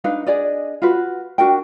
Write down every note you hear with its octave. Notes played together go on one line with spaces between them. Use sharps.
D4 D#4 B4 F5
D4 G#4 D5 D#5
F4 F#4 B4
D4 F#4 A#4 G5